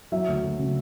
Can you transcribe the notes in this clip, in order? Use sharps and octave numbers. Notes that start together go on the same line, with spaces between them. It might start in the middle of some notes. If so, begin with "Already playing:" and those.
F#3 E5
D2
D2
C#3